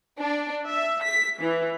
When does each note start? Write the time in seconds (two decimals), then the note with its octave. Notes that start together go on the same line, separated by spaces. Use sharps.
0.18 D4
0.67 E5
1.02 B6
1.40 E3